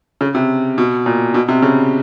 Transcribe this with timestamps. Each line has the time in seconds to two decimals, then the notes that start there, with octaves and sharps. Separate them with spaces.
0.21 C#3
0.35 C3
0.78 B2
1.06 A#2
1.34 B2
1.48 C3
1.62 C#3